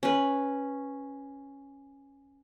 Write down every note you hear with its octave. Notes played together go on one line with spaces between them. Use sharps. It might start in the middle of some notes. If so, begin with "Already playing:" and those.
C#4 B4